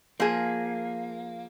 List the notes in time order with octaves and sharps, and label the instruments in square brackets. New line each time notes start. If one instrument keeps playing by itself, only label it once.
[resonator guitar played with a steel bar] F3 G#4 [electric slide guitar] A#3